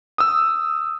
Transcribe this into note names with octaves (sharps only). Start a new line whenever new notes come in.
D#6 E6